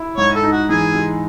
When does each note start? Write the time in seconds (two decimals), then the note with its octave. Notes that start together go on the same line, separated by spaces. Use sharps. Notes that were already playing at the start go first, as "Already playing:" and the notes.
Already playing: E4
0.17 G#2 C#5
0.35 A4
0.43 D#4
0.52 F#4
0.69 E3 G#4
0.95 G#3